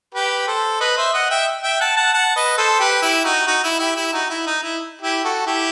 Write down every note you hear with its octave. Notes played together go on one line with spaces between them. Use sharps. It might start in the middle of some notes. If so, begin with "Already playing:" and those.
G4 B4
A4 C5
B4 D#5
C5 E5
D#5 F#5
E5 G5
E5 G5
F#5 A5
F#5 A5
F#5 A5
B4 D#5
A4 C5
G4 B4
E4 G4
D#4 F#4
D#4 F#4
E4
E4 G4
E4 G4
D#4 F#4
E4
D#4
E4
E4 G4
F#4 A4
E4 G4